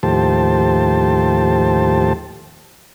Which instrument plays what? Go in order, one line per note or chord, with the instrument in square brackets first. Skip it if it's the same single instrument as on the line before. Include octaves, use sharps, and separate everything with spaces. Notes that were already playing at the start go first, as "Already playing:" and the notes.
[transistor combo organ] D#2 A2 F3 G4 C5 A5